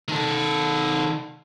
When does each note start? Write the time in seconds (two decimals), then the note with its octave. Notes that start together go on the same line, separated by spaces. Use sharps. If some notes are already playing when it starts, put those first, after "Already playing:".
0.09 D#3 A4